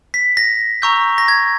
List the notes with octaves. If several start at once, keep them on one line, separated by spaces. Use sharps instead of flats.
B6
A#6
A#5 C#6 E6 G6
A#6
G#6